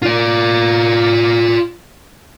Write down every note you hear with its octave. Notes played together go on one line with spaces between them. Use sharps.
F4 D5